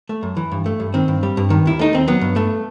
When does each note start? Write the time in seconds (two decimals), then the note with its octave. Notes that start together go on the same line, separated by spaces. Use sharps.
0.09 A3
0.23 F#2
0.37 E3
0.52 G2
0.66 A3
0.80 G2
0.94 D#3 C4
1.08 G2
1.23 G3
1.37 G2
1.50 D#3
1.66 D#2 E4
1.79 A3 D#4
1.93 D#2 C4
2.08 F#3 B3
2.21 G2
2.36 A3